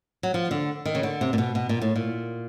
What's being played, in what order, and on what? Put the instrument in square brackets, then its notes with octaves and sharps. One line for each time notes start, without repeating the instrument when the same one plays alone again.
[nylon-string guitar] F#3
F3
D3
D#3
C#3
D3
C3
A#2
B2
B2
A#2
A2
A#2